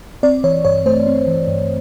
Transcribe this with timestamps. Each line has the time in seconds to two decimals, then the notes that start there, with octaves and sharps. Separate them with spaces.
0.23 C4 D5
0.44 E3 C#5
0.65 G2 C#5
0.86 A3 C5
1.07 C4
1.27 E3
1.47 G2